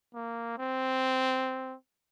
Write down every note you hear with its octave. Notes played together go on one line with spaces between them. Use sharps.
A#3
C4